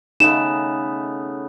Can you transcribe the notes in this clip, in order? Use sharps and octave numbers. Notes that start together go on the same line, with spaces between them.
C#3 A3 B3 D#4 E7